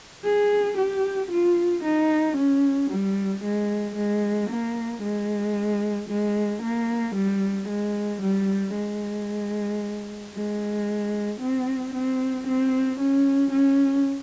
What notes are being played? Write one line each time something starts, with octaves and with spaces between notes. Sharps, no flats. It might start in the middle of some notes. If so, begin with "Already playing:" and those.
G#4
G4
F4
D#4
C#4
G3
G#3
G#3
A#3
G#3
G#3
A#3
G3
G#3
G3
G#3
G#3
C4
C4
C4
C#4
C#4